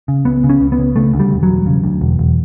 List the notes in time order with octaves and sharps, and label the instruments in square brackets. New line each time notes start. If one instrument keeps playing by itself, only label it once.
[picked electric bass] C#3
C#2 B3
C#3
C#4
C#2
B3
C#3
C#3 A3
D2
G3
E1
F#3
E1
C#3
D2
E1
E1